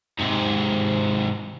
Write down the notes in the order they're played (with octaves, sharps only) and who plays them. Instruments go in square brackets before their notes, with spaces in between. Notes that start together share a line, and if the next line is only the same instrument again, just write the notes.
[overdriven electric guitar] G#2 C3